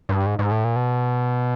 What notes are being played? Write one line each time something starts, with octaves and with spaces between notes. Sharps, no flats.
G2
G#2
G#2
A2
A#2
B2